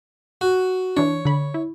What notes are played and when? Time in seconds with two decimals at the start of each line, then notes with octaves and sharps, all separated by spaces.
0.41 F#4
0.97 E3 D4 C#5
1.25 D3 B5
1.54 E4